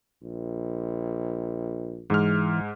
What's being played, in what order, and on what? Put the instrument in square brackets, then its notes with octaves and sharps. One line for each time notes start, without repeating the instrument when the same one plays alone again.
[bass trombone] A#1
[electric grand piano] G#2 G#3 F6 [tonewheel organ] E3